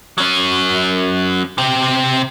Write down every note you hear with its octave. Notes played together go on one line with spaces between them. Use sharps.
F#3 C#4
C3 G5